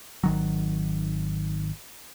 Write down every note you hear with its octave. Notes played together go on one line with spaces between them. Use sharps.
G#1 D#3 F#3